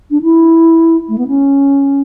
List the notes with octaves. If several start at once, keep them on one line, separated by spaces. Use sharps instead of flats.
D4
E4
A3
B3
C#4